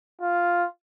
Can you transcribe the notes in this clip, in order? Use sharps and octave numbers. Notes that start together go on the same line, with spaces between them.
F4